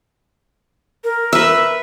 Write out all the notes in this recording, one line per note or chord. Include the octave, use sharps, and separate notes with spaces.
A#4
B4 E5